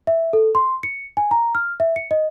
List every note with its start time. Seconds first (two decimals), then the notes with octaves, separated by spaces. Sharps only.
0.07 E5
0.33 A4
0.55 C6
0.83 C#7
1.17 G#5
1.31 A#5
1.55 F6
1.80 E5
1.96 C#7
2.11 D#5